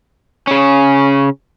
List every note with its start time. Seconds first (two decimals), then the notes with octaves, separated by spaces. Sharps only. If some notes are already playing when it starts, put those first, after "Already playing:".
0.47 C#3 C#4